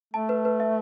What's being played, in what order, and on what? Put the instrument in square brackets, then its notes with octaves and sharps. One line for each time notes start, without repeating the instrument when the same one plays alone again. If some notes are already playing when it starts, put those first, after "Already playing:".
[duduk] A3 [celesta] A5
[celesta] B4
B4
E5